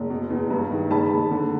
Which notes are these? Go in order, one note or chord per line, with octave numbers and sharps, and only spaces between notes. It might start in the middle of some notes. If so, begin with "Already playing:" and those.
Already playing: F#1
B2
E2
G2
D#3
F#1 A5 B5
F#1
D3